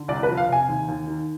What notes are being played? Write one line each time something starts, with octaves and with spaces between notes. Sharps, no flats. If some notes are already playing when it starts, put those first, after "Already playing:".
Already playing: D3
C2 D5
B4
F3
F5
C3 G#5
D#2
D#2
D#3